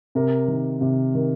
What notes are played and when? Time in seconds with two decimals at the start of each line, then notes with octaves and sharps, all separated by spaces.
0.15 C3 A#4
0.48 D#3
0.81 C3
1.14 D#3